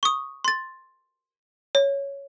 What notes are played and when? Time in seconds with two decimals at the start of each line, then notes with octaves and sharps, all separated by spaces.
0.03 C#6 D#6
0.45 C6 A6
1.75 C#5